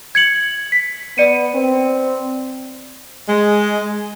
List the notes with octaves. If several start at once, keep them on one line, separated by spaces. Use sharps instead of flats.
G#6 C#7 F#7
B6
B3 D5 C#7 D#7
C4
G#3